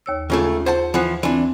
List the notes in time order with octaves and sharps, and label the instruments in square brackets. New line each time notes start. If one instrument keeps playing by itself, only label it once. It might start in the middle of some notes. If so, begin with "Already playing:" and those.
[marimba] D#2 C#5 E6
[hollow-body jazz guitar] C#2 C#3 A3 [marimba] F4 G#4
[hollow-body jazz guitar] C5 F#5 A5
[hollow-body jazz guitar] E3 F3 [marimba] F#5 F#6
[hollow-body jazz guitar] E3 D4 [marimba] C4